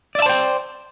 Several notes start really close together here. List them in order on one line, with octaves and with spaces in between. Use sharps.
D5 E5 A5 C5 G5